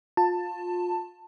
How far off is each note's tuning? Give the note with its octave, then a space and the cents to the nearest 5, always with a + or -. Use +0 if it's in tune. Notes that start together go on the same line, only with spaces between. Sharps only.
F4 +25 A5 +15